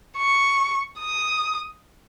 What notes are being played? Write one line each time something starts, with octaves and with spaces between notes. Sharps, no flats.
C#6
D#6